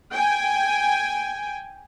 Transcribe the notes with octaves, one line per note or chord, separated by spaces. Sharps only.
G5 G#5